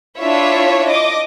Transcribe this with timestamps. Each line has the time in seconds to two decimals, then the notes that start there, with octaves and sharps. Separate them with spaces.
0.17 D4 E4 F4 C#5 E5
0.88 D#5 D6